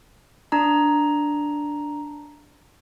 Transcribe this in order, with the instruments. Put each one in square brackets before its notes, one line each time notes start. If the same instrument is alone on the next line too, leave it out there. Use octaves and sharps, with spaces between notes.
[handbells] D4 A#5